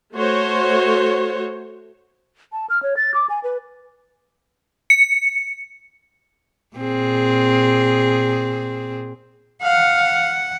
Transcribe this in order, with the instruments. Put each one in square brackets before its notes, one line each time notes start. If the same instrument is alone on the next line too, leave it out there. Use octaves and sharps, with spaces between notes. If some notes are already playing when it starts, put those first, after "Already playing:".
[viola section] A3 F#4 C5 C#5
[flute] A5
F6
C#5
A6
D6
G#5
B4
[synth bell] C#7
[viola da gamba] A#2 C4 G#4
[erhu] F5 [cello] F#5